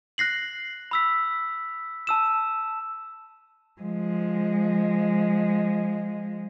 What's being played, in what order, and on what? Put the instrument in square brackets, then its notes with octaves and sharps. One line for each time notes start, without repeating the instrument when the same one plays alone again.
[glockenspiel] F#6 A#6 C7 F#7
B5 E6 B6
A5 E6 E7
[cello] F3 G#3